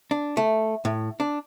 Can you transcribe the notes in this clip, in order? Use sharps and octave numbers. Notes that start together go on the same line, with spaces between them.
D4
A3
A2
D4